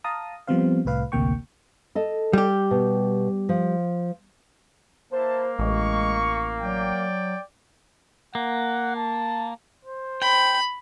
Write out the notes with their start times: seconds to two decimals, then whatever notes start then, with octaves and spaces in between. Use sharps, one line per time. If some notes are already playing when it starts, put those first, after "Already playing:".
0.04 F5 A5 A#5 D#6
0.47 F3 G3 B3 C4 C5 F5
0.85 C2 A2 B4 F5
1.12 A1 D2 C3 A#3 G5 C#6
1.95 A4 D#5
2.33 G3 G4
2.71 B2
3.49 F3
5.13 A#3 E4 C5 A5
5.59 A1 G#3 C#6
6.61 F#3 D5 G5
8.35 A#3 F#5
8.96 A5
9.85 C5
10.22 G5 B5